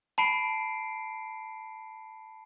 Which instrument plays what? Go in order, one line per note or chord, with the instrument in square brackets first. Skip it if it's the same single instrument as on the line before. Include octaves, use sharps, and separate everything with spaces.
[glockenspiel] A5 B5 C7 D7